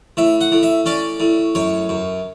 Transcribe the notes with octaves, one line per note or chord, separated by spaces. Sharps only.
A2 E5
F#5
A2
E5
C#4 D5
A2
F#2 C#5
F#2